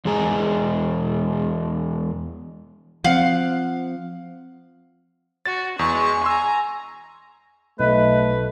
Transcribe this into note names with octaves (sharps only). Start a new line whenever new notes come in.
E2 G#3 G#4 A#5
F3 C4 F5 F#5
F#4 A6
E2 G#3 C#6
G#5 A#5 C6 E6
B1 A3 B4 D#5